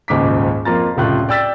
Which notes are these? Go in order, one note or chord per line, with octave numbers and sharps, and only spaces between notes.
D#1 C#2 G#2 D6 B6
F2 A#3 F4 A#5 A6
F1 C#2 A2 F4 F#6
D5 G5 E6 A6 B6